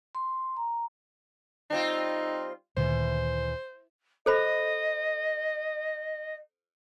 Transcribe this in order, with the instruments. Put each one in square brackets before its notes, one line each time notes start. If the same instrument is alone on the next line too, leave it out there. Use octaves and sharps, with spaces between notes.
[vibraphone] C6
A#5
[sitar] G3 C4 F4 [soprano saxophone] D#4
[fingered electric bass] D2 A#2 D#3 [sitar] E3 [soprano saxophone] C5
[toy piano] A4 C5 B5 [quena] D#5